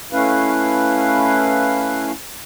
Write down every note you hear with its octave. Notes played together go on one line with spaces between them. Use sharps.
A3 C#4 E4 B4 F5